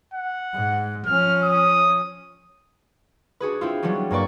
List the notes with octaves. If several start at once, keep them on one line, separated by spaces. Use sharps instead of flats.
F#5
G#2
F3 C#4 F6
D#6
D4 F#4 G#4 B4
C4 E4 F4
F#3 G3 B3 C#4 D4
G2 A#3 B4 D5 C#6